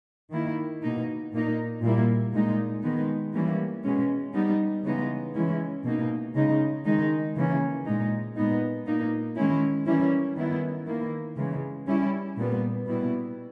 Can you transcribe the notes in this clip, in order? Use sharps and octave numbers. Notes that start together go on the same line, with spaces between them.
D#3 A#3 E4
B2 A#3 D#4
A#2 A#3 D#4
A#2 G3 A#3 E4
A#2 G#3 D#4
D#3 G#3 B3 D#4
E3 G3 A#3 C#4 E4
B2 G#3 C#4
G3 B3 D#4
C#3 E3 G#3 B3 D#4
E3 G#3 C#4 E4
B2 A#3 D#4
C#3 G#3 D#4
D#3 G#3 D#4
C#3 E3 A#3 C#4
A#2 G#3 D#4
A#2 G#3 B3 D#4
A#2 A#3 D#4
D#3 G#3 C#4 E4
E3 G3 A#3 C#4 E4
D#3 G3 B3 E4
D#3 A#3 E4
C#3 E3 G#3
G3 C#4 E4
A#2 G3 B3
B2 G3 B3 E4